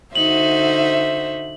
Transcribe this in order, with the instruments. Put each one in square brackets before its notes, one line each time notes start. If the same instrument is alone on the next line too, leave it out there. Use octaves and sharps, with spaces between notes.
[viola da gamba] D3 D#4 F#4 [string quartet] C5 E5 [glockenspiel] F#7